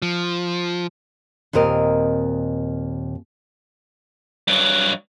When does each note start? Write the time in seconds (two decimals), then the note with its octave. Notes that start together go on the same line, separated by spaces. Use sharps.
0.02 F3
1.53 D#2 A#2 C4 A#4 D#5
4.48 G2 F#3